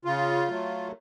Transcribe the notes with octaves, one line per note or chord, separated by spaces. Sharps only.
C#3 F4
F#3 A3